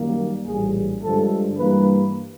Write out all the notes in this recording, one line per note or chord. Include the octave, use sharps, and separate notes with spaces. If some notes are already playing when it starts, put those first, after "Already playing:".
Already playing: F#2 D#3 G3 A#3
A#1 A2 E3 G3 G#4
G2 D3 F3 G#3 A4
G2 E3 G3 A#3 B4